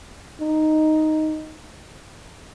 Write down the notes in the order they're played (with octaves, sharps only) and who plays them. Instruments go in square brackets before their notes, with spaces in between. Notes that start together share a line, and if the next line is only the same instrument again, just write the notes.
[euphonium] D#4